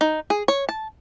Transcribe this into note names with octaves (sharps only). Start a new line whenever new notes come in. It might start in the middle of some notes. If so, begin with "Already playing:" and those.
D#4
G#4
C#5
A5